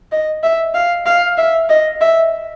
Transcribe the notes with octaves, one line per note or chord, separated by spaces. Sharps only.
D#5
E5
F5
F5
E5
D#5
E5